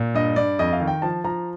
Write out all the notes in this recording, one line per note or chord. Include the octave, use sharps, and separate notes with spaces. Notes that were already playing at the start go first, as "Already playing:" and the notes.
Already playing: A#2
G2 D#5
G2 D5
F2 D#5
F5
D#3
G5
F3 A5
F3 A#5